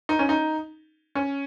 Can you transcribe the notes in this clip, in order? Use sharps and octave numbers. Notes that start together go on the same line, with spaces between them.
D#4
C#4
D#4
C#4